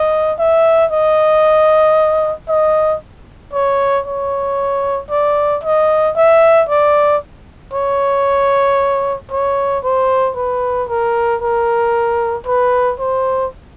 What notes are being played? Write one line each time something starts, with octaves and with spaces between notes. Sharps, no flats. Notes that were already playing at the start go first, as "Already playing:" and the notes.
Already playing: D#5
E5
D#5
D#5
C#5
C#5
D5
D#5
E5
D5
C#5
C#5
C5
B4
A#4
A#4
B4
C5